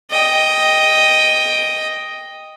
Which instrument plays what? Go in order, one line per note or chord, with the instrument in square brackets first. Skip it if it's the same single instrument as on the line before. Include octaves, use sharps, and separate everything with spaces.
[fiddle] D#5 G5